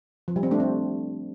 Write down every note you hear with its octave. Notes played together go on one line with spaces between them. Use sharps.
F3
G3
C4
A3 D4
C4